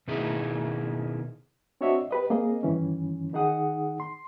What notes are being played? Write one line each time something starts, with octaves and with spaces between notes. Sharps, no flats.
B2 D#3 E4 G#4
C4 D4 F#4 C#5 D#5 E5
G4 B4 D#5
A#3 C4 G#4 D#5
G2 D#3 E3 C#4
D#3 D#4 G#4 F#5 D#6
C6